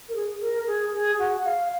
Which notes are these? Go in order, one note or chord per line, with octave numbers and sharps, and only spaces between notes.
A#4
G#4
A#4
G#4
G#4
F#4
F5